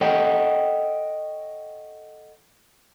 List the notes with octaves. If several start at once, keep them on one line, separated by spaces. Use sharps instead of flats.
A4 C#5 D#5 F#5 G5